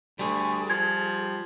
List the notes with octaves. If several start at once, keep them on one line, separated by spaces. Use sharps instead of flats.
D2 G3 G#4
F3 G#6